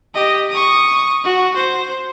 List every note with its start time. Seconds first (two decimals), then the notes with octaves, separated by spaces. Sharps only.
0.15 G4 D#5
0.50 C#6 D#6
1.24 F#4
1.56 C5